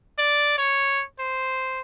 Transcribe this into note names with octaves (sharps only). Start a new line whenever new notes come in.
D5
C#5
C5